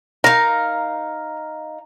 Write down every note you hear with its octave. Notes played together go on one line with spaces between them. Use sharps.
D#4 A#4 F5